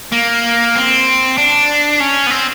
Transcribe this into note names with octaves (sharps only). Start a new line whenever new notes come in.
A#3
C4
D4
C#4
B3
C4